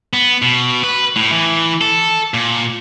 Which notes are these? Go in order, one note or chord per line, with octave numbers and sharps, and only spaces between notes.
B3
B2
B4
A2
E3
A4
A#2